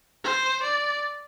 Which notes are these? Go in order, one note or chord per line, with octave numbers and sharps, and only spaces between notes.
C5
D5